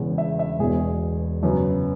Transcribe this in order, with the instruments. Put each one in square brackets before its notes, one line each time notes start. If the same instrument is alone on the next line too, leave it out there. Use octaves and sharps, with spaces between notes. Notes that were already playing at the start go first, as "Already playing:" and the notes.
Already playing: [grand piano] E1 E2 C#3
E5
E5
E1 E2 B2 G#4
F#2 C#3 F#3 B3